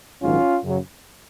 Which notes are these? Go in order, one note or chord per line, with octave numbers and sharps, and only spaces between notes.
A#1 G#2 D#3 F#3 C#4 F4
F#2 C#3 F#3